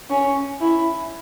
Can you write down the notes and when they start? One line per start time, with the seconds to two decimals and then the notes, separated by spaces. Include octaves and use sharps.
0.10 C#4
0.61 E4